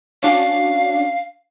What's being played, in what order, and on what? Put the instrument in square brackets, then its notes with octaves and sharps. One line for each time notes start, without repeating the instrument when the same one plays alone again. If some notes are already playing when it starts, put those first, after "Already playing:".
[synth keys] C#4 D4 F#4 [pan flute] F5